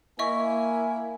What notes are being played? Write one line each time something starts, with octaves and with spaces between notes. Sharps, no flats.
A#3 E4 D#5 E5 G#5 C#6